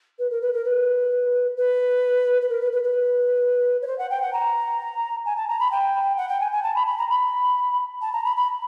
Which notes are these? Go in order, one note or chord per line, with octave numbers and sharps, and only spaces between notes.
B4
A#4
B4
A#4
B4
B4
B4
A#4
B4
B4
B4
C#5
C5
F#5
G5
F#5
A#5
G#5
A5
A#5
B5
G5
F#5
G5
G#5
G#5
A5
B5
B5
A#5
B5
A5
A#5
B5
B5